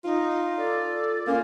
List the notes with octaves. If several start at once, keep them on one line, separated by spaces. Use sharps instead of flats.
D#4 F4
A4 D5
A#3 C#4 F4